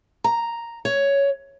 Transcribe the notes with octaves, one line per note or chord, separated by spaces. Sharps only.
A#5
C#5